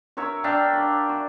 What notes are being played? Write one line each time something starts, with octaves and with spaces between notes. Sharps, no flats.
F#4 A#4 C#5 E5
D4 E5 F5 G5
D5
F#4